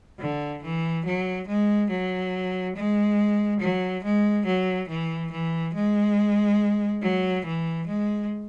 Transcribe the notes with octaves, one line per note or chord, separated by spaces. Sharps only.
D3
E3
F#3
G#3
F#3
G#3
F#3
G#3
F#3
E3
E3
G#3
F#3
E3
G#3